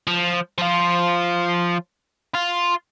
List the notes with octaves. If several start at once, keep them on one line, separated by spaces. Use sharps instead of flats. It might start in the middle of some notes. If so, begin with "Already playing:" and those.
F3
F3 F4
F4